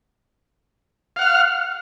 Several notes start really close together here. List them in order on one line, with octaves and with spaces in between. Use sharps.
F5 F#5 F6